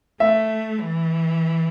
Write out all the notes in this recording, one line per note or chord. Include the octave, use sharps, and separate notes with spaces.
A3 E5
E3